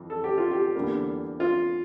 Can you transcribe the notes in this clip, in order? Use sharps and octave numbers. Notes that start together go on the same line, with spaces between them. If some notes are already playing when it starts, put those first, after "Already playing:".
Already playing: F2 E3
A4
G4
F4
G4
E2 D3 G3 A#3
F4